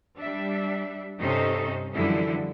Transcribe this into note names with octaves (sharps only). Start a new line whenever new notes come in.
G3 D4 E5
G2 C3 C#4 D#4 A4 C5
F#2 D3 E3 F3 G3 E4